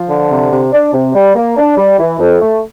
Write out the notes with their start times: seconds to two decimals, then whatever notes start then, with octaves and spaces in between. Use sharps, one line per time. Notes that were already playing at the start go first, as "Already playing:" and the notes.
Already playing: F3
0.09 D3
0.30 C3
0.52 C3
0.73 D4
0.93 C3
1.14 G3
1.36 A#3
1.57 D4
1.77 G3
1.99 E3
2.19 F2
2.41 A3